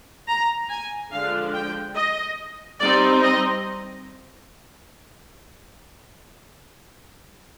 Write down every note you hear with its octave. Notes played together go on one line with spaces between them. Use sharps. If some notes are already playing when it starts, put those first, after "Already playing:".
A#5
G#5
D3 F3 G#3 D4 F4 F5
G5
D#5
G3 C4 D#4 D5
D#5